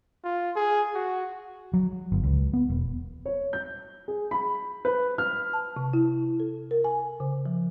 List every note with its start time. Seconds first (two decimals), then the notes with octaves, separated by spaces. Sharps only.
0.24 F4
0.56 G#4
0.94 F#4
1.73 F#3
2.12 G1
2.23 C#2
2.53 B3
2.69 E1
3.26 C#5
3.53 G6
4.08 G#4
4.31 B5
4.85 B4
5.18 F6
5.53 A5
5.77 C3
5.93 E4
6.40 A4
6.71 A#4
6.84 G#5
7.20 C#3
7.46 F3